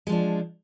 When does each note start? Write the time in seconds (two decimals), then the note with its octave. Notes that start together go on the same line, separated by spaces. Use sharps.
0.07 G#3
0.09 F3
0.12 D4